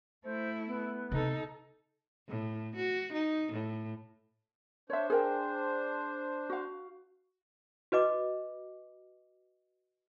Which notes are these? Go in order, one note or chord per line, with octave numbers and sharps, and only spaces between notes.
A3 E4 C5
B3
C3 D#4 A4
A2
F#4
D#4
A2
D4 C5 C#5 E5
G#4 A#4 G5
F#4 F5
F#4 B4 D#5 D6